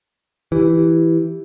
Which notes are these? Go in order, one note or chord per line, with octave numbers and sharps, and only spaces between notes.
E3 G4